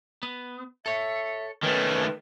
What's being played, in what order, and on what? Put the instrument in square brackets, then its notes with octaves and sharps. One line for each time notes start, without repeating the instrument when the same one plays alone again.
[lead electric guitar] B3
[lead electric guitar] A4 C#5 [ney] E5
[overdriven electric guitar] D#3 A3 [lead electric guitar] C#4 [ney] B4